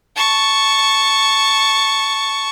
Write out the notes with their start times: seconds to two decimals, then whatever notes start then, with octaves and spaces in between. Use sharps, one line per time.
0.16 A5 C#6